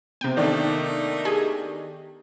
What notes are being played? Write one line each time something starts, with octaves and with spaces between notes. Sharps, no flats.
C3 B3 G5
D#3 A3 A#3 D4 D#4
G4 G#4